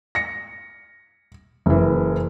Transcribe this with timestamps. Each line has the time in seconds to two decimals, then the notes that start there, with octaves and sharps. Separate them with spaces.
0.15 A#6 C#7
1.66 F#1 E3